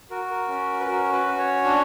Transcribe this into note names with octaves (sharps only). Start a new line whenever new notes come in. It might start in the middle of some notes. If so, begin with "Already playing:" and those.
F#4 A#4
A#4
C#4
B4
F#4 A#4
B4
C#4
C#5
D4